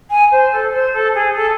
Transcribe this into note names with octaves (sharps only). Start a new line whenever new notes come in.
G#5
C5
A4
C5
A4
G#4
A4